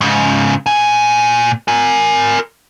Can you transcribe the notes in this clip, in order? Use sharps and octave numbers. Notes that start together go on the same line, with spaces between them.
G#2 C#3
A#2 G#5
A#4 G#5